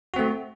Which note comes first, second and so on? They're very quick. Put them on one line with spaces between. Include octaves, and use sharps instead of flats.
F#4 C4 A3